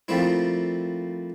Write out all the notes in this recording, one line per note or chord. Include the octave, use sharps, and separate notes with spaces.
F3 G3 A3 A#3 C4 E4